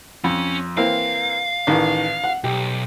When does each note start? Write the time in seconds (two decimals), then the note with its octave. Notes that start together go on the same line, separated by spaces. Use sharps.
0.24 F2 C#4
0.77 E3 A#3 C4 F5
1.67 A1 D#3 E3
2.24 F#5
2.44 B1 G4